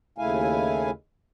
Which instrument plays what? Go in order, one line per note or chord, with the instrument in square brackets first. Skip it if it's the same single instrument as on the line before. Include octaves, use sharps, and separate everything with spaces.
[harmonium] D#2 C#3 A3 E4 F5 G#5